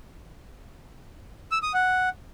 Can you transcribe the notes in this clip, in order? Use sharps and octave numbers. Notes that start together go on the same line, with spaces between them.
E6
D#6
F#5